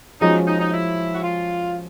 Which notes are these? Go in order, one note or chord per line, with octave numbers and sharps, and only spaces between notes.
F3 G#3 C#4 D#4 F#4
D#4
D#4
E4
F#4
F4